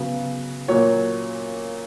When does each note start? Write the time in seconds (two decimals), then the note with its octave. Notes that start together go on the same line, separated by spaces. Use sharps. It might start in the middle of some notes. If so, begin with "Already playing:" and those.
Already playing: C#3 F#3 B3
0.68 A#2 F#3 A#3 C#5